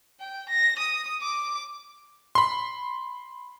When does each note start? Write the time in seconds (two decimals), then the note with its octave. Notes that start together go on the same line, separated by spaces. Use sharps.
0.20 G5
0.49 A#6
0.79 D#6
1.22 D6
2.35 B5 C6